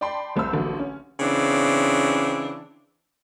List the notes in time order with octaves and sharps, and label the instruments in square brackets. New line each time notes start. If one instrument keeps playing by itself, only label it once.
[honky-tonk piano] D5 G5 A5 B5 C6
F1 C2 C5 B5 E6
A1 D3 F#3 A#3
C#4
[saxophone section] C#3 E3 C4 D4